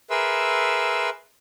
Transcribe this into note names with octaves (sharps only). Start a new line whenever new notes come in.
G#4 A#4 B4 E5 C6 E6